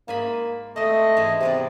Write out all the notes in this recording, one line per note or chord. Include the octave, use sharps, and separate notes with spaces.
G#2 A#3 G#5 B5
G#3 A3 C4 D#5
G#2 E3
C3 G#3 B3 D5